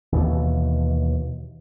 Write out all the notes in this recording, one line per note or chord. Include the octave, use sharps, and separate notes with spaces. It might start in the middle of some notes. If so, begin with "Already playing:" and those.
D#2 B2 E3